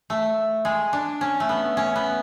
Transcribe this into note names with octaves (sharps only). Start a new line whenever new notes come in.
A3
G#3
D4
C#4
A3
B3
C#4
B3